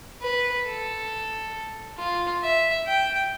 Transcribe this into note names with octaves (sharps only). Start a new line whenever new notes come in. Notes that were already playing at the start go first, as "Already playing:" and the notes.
B4
A4
F4
E5
G5